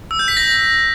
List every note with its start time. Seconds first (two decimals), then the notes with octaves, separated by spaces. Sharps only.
0.11 E6
0.19 G6
0.28 B6
0.37 A#6